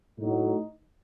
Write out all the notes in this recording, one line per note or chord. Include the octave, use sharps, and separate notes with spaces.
A2 F#3 D#4